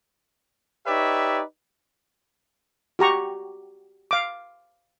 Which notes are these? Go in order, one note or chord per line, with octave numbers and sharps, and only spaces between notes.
D#4 G4 B4 C#5 D5 E5
F#4 G4 A#5 C#6
F5 D6